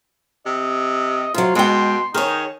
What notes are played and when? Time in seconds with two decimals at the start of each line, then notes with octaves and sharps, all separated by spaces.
0.46 C3 D#5
1.34 C3 F#3 F4
1.55 B2 G#3 G5 C6
2.14 D#3 D#4 G#4 C#5